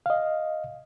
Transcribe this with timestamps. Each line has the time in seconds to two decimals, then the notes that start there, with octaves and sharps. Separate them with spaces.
0.06 D#5 F5